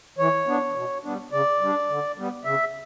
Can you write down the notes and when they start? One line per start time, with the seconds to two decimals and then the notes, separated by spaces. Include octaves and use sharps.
0.18 E3 C#5
0.47 B3 D4
0.75 B2
1.03 G3 B3 D4
1.32 C#3 D5
1.61 G3 D4
1.89 D3
2.18 G3 B3
2.45 C#3 E5